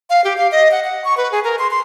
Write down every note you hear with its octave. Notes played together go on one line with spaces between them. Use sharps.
F5
G4
F5
D#5
F#5
F#5
C#6
B4
G#4
A#4
C6
C6